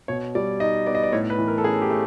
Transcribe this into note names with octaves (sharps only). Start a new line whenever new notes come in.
B2 C#5
G3 D5
D#4 D#5
B3 D5
D#5
D5
A2 C#5
B4
E3
A#4
A4
C#4 G#4
G4
A3